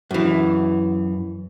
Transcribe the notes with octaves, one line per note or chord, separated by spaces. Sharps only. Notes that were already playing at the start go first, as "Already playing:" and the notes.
F#2 E3